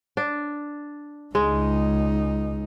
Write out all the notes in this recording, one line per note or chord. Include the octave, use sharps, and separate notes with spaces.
D4
C#2 G#3 D#4